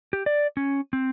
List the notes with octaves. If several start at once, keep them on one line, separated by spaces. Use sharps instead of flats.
G4
D5
C#4
C4